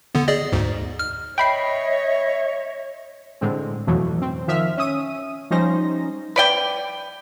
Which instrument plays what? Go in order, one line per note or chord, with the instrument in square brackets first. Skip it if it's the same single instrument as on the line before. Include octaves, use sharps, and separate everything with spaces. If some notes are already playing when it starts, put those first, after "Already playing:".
[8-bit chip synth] D3 B3
G#4 D5 D#5
D2 G#2
F6
[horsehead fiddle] C#5 [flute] D#5 [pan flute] E5 [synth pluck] G5 B5 C7
[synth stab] A2 D3 G#3 C4
F2 B2 E3 F#3 A3
C4
D#3 F3 E5 F6 B6
C#4 E5 D#6 D#7
F3 G3 C#4 D#4 C5 A#6
[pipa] B4 D5 G5